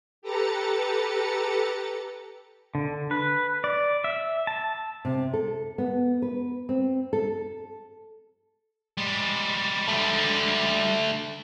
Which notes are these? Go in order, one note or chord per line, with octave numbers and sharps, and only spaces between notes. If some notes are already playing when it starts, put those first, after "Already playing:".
G4 A4 B4 A#5 A6 C#7
D3
B4
D5
E5
A5
C3
A4
B3
B4
C4
A4
G3 G#3
D3 A3